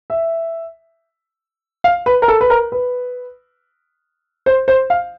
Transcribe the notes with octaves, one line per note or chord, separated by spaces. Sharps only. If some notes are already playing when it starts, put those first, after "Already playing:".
E5
F5
B4
A#4
A4
B4
A#4
B4
C5
C5
F5